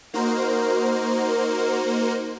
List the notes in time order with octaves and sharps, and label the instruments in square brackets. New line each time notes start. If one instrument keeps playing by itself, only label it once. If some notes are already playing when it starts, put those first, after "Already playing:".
[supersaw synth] A#3 D#4 F#4 A#4 C5